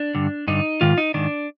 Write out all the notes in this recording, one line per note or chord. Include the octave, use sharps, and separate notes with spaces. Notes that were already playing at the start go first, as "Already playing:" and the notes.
Already playing: D4
G2 D3
G2 D3 D#4
G#2 D#3 F4
D#4
G#2 D#3 D4